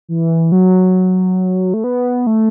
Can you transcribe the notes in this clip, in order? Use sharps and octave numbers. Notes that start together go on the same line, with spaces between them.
E3
F#3
A3
B3
A3